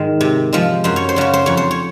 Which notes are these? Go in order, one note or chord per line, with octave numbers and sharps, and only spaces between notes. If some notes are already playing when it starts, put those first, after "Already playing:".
Already playing: G#2 D#3 G#3
C3
F3 G#3
F#2 C5
C#5
C5
C#3 F#3 C#5
C5
F2 C#5
C5
C#5